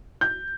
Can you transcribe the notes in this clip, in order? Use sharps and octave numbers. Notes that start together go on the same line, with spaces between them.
G6